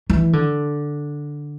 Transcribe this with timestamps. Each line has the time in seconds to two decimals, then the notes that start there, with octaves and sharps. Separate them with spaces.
0.10 E3
0.33 D3